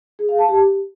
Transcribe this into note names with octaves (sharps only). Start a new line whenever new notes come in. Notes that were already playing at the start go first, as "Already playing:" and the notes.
G#4
F5
A5
G4